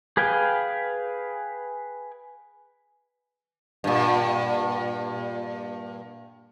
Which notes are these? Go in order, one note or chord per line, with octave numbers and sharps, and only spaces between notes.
G#4 B4 F5 G5 G#5
G2 A#2